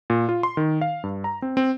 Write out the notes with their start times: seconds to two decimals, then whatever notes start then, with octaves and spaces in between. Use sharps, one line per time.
0.10 A#2
0.29 F4
0.43 C6
0.57 D#3
0.81 F5
1.04 G2
1.24 A#5
1.42 C4
1.57 C4